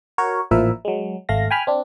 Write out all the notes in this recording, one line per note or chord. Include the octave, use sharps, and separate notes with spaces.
F#4 A#4 C#5
A1 A#2 F3 E4 A#4 E5
F#3 G#3
G#1 A3 F5 A#6
G5 G#5 B5 F6
C4 D4